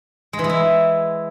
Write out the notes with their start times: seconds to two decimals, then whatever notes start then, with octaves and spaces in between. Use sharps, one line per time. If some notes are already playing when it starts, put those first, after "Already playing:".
0.33 G#3
0.39 E3
0.44 G#3
0.49 E4